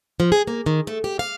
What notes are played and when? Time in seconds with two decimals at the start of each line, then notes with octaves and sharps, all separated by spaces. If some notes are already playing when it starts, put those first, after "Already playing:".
0.20 F3
0.32 G#4
0.47 A#3
0.66 D#3
0.87 A3
1.04 G4
1.19 F5